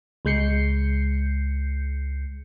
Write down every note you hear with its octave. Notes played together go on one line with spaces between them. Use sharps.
C#2 G#3 G6 C7 C#7